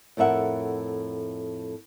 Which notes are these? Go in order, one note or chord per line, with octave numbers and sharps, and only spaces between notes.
F2 A2 A#4 E5 F#5